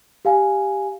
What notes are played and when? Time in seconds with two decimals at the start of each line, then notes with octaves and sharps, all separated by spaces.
0.25 G4 F5 G#5